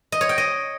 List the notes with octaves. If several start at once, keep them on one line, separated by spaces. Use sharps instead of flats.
D#5
C#5
G5
D#5